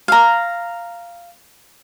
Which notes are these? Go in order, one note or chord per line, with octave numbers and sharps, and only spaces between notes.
F5 A#5